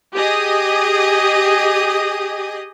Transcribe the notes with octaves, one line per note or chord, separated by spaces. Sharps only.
G4 G#4 D#5 D#6